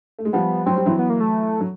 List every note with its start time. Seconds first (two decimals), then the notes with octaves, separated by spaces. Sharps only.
0.19 A3
0.25 G#3
0.33 F3 G3 B3
0.66 F#3 C4
0.76 G3
0.86 E3 F#3
0.99 B3
1.10 A#3
1.20 A3
1.61 F#3